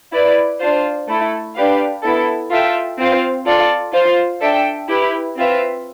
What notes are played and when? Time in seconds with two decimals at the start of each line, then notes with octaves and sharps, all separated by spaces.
0.12 E4 B4 D5
0.59 D4 F4 C5
1.08 A3 E4 A4
1.55 D4 G4 B4 F5
2.03 B3 E4 A4
2.50 F4 A4 E5 G5
2.98 C4 F4 C5 F5
3.46 F4 A4 D5
3.93 F4 C5 F5
4.41 D4 A4 E5 G5
4.89 E4 G4 B4
5.37 C4 F4 B4 E5